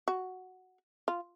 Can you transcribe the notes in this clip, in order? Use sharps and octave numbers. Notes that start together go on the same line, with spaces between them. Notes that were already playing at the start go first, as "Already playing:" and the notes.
F#4
F4